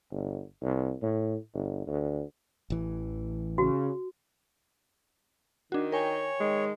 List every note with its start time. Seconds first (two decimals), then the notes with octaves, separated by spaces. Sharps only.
0.11 G1
0.62 C2
1.02 A2
1.54 G1
1.87 D2
2.70 A1 E3
3.58 C#3 F#4
5.72 D#3 D4 F#4
5.92 A#4 C#5 G5 G#5
6.40 D#3 G#3